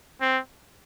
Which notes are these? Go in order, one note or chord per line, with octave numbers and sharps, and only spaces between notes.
C4